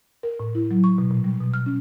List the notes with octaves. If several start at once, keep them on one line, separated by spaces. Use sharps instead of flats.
A#4
A2
E4
F#3
C#6
B2
A#2
G3
B2
F6
C#4